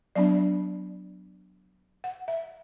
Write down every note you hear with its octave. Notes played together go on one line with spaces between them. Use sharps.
F#3 B3 D4 D5
F#5
E5